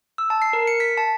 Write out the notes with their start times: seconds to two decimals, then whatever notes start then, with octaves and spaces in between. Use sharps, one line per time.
0.18 E6
0.30 A5
0.42 C7
0.53 A#4
0.67 C#7
0.80 B6
0.97 A5